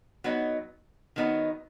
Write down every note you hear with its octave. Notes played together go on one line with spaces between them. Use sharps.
F#3 B3 D#4
D#3 F#3 B3 D#4